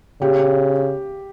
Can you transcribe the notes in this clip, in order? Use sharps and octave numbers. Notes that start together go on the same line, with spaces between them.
C#3 G4